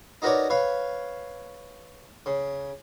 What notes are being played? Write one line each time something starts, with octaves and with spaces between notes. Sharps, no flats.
D#4 F#4 A#4 B4 C#5 D5
B4 C#5 F5
C#3